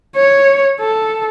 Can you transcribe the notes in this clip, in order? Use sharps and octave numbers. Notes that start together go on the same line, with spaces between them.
C#5
A4